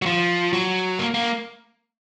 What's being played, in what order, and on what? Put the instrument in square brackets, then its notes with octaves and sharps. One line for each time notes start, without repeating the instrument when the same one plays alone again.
[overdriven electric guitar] F#3
F3
F#3
A#3
A#3